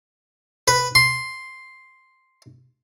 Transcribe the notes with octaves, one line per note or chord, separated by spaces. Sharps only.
B4
C6